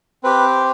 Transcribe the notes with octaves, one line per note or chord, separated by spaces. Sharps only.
C4 G4 B4